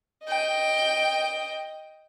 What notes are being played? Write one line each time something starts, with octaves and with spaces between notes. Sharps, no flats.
D#5 G5